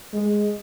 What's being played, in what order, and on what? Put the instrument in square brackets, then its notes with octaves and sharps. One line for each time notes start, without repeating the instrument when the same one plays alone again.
[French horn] G#3